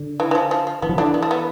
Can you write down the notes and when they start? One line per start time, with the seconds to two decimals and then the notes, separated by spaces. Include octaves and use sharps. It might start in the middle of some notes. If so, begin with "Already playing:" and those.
Already playing: D3
0.20 E3
0.31 E3
0.35 F3
0.51 F3
0.67 F3
0.82 E3 B3
0.89 F3
0.96 D3 E3 D4
1.14 B3
1.23 A3
1.31 B3